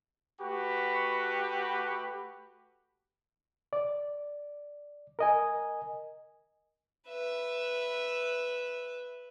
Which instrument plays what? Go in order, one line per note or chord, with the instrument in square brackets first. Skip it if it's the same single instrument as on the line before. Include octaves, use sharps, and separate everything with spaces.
[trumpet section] A3 F#4 G4 B4
[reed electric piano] D5
A#4 D#5 G#5
[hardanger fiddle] B4 E5